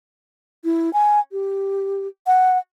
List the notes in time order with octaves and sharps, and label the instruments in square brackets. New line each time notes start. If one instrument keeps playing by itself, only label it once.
[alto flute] E4
G#5
G4
F#5